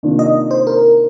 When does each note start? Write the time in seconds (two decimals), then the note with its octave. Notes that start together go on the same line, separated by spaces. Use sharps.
0.03 C3 D#3 A#3 D4 F4
0.19 D#5
0.51 C5
0.67 A#4